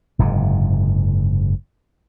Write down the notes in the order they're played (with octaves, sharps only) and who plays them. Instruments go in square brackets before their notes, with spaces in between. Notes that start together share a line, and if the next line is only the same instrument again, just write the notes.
[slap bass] F#1 G#2 C3